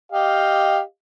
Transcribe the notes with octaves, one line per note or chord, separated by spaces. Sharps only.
G4 D#5 F5